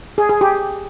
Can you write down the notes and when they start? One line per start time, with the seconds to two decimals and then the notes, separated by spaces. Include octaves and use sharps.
0.18 G#4
0.29 G#4
0.41 G4